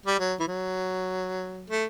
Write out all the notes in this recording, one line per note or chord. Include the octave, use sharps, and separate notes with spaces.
G3
F#3
E3
F#3
A3